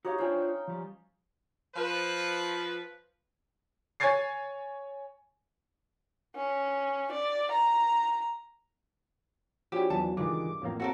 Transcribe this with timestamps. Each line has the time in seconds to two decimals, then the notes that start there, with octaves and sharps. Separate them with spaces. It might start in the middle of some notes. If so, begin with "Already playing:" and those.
0.05 D#4 F#4 G4 C#5 F5
0.18 C#4 D4 F4 C5 G5
0.67 F3 G3
1.76 F3 B4
4.00 C#5 G#5 C#6 G#6 A6 C7
6.36 C#4
7.12 D5
7.52 A#5
9.72 F3 C#4 D4 E4 F#4 G4
9.90 E2 E3 F#3 A5
10.17 C#2 G2 D#3 E3 G#3 D4 F4 D6
10.62 A1 F2 A2 A#3 F5
10.80 C4 E4 F#4 A4 A#4 C#5 F5